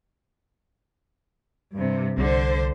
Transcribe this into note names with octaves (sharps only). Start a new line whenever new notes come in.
G2 C3
C2 D3 C5